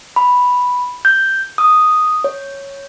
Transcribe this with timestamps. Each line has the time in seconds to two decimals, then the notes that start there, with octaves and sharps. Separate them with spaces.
0.16 B5
1.05 G6
1.58 D#6
2.24 C#5